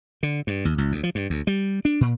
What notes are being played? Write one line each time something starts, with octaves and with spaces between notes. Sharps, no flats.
D3
G2
D#2
C#2
D2
F3
G2
D2
G3
D4
A#2